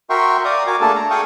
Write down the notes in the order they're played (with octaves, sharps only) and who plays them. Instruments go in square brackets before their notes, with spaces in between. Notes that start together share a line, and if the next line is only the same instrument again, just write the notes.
[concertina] F#4 A#4 E5 G5 C6 C#6
D5 F5 A#5 D#6
F#4 A#4 G#5 D6
A3 A#3 D4 G#4 A4 A5
A#5
G#4 A4 F5 G5 C#6 D#6